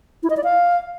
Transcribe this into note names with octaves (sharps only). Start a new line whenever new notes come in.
E4
D#5
D5
F5